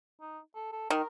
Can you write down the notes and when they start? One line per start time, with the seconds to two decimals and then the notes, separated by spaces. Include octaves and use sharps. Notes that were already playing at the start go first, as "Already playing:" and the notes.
0.21 D#4
0.55 A4
0.72 A4
0.90 D#3 A#4